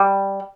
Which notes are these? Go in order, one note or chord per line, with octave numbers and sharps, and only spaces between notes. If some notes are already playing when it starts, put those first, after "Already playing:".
Already playing: G3